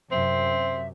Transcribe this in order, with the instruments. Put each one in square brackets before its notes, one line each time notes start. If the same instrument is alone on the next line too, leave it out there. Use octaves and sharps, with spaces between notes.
[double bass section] F#2 C3 [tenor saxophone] C4 [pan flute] E5